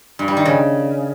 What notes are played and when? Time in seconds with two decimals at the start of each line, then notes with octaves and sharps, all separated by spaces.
0.19 G2
0.28 G3
0.37 D#3
0.45 C#3